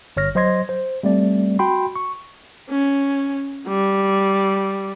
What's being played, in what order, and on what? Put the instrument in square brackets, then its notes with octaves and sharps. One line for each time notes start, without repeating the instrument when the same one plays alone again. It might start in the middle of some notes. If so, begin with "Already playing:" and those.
[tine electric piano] G1 C#5 F6 A#6
F#3 C5 D#5 C6 G#6 A#6
C5
G3 A3 C4 D5
F#4 G5 B5 C6
C#6
[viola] C#4
G3